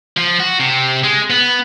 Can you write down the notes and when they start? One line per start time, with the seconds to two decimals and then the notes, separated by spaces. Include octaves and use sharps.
0.17 F3
0.40 F#4
0.59 C3
1.03 G#3
1.30 B3